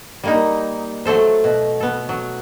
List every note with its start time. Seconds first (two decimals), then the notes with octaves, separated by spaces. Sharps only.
0.23 G3 A#3 D#4
1.05 F#3 A3 A4 C5
1.44 B2
1.80 B3 A4
2.09 F#3